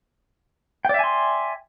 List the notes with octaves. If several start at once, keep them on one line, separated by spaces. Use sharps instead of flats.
D5 E5 G5 G#5 C6